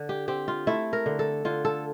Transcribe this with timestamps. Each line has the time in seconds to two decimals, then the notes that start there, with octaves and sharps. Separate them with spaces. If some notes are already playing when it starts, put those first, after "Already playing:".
Already playing: D3
0.09 G4
0.28 C4 G4
0.48 F4
0.67 A3 E4
0.93 A#4
1.06 D3
1.19 A4
1.45 D3 F4
1.65 A4